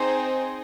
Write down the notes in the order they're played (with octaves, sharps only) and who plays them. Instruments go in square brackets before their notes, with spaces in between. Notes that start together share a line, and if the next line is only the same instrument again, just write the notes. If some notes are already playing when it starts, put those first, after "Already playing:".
Already playing: [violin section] C4 D#4 G#4 C5